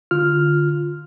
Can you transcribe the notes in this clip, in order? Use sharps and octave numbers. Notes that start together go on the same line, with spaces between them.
D3 F4 F6